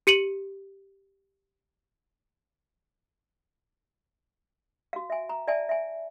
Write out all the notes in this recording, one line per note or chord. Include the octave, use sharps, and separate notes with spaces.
G4 C#7 D#7 F#7
F#4 F5
E5 G#5
A#5
D5 E5 G#5 A5
E5 G#5